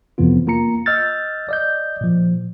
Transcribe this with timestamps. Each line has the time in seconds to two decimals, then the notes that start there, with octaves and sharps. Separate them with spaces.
0.18 F2 C3 E3 B3 F4
0.47 A#3 F4 A#5 C#7
0.86 D#5 E6 F6 G6 A6
1.49 D5 D#5 G6
2.01 A#2 F3